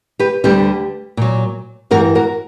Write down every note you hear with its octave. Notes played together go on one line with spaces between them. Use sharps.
G4 B4
D2 D3 G3 G4 B4
A#2 F#3
G2 E3 G3 F#4 A#4
F#4 A#4